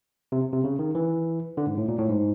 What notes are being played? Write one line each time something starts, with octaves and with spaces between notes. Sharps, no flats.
C3
C3
C#3
D#3
E3
D3
G#2
A2
A#2
A2
G#2